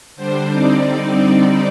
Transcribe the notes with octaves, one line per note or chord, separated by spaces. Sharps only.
D3 G3 D4 C5
D3 G3 C4 D#4 D5